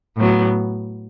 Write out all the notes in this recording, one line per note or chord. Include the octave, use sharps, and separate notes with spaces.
A2 F#3 B3